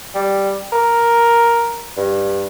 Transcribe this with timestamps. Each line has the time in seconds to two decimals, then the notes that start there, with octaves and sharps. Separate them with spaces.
0.15 G3
0.72 A#4
1.97 G2